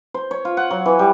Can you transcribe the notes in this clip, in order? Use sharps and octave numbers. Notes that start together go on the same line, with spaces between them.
C5
C#5
F4
F#5
F#3
E3
G3